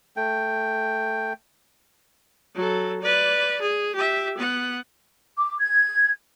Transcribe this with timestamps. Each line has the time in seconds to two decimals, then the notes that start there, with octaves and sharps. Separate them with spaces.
0.17 A3 G5
2.55 F#3 A4
3.01 B4 D5
3.62 G#4
3.95 G4 E5
4.37 B3 F#5
5.36 D6
5.59 G#6